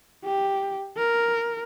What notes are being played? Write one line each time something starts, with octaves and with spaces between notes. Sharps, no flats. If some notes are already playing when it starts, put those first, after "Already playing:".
G4
A#4